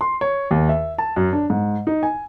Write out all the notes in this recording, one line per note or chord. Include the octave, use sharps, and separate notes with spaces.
C6
C#5
D#2
E5
A5
F#2
D4
G#2
D#4
G#5